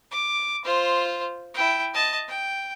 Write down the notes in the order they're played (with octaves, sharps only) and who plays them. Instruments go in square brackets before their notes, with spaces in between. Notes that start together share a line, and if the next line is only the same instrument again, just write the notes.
[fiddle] D6
F4 C5
E4 G5
D#5 A5
G5